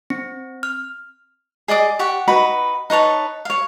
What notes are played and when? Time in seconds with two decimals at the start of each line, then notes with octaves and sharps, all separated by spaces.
0.10 C4
0.63 F6
1.68 G#4 D5 D#5 D6
1.99 G4 F#5 C#6
2.28 D#4 F#4 B4 B5
2.90 D#4 B4 C#5 A5
3.45 C#5 F5